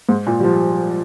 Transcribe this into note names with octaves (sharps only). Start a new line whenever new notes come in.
G#2
A#2
G3
F3